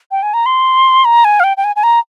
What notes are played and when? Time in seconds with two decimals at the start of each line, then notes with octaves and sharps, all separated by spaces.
0.11 G5
0.23 G#5
0.34 A#5
0.46 C6
1.05 A#5
1.25 G#5
1.40 F5
1.44 G5
1.57 G5
1.64 G#5
1.76 G#5
1.83 A#5